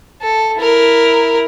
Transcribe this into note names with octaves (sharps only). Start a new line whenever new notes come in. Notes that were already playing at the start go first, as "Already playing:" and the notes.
A4
E4 A#4